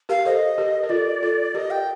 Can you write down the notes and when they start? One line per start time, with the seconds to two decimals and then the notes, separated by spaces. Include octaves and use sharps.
0.09 G4 A#4 F5
0.25 A4 C5 D#5
0.58 G4 A#4
0.83 A#4
0.90 F4 A4 D5
1.22 F4 A4
1.54 G4 A#4 D#5
1.71 G5